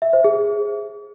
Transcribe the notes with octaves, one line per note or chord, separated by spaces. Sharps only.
E5
C5
G#4